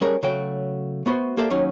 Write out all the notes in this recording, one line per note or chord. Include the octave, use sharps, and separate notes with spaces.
G3 A3 C#4 G#4 A#4 F#5
C#3 F#3 A3 F#4 G5
A3 B3 F#4 C5
A#3 G4 A4 C5 D5 E5
D#2 F#3 C#4 D#4